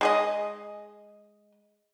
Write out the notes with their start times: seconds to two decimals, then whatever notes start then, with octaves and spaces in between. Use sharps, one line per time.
0.01 G#3 G#4 D#5